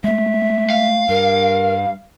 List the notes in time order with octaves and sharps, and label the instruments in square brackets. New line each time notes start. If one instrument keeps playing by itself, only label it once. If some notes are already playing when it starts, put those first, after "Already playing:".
[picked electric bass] G#3 A3 [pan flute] E5
[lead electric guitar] F5
[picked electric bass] G2 [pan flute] A#4